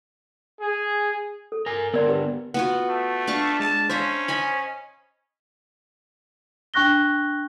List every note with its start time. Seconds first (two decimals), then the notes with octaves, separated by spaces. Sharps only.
0.61 G#4
1.52 A4
1.66 A#4 G#5
1.94 D3 B3 A#4 D5 C6
2.08 G4 B4
2.54 B3 F4 F#4 F#5
2.89 A3
3.27 D4 F5 C#6
3.60 G#3 A5
3.90 C#4 C5 E5 F5 A#5
4.28 D#5 G#5 B5
6.74 D4 G5 C#6 F#6 A#6 G7